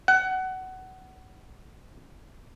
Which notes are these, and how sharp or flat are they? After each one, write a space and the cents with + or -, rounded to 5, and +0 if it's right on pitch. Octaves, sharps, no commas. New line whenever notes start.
F#5 +20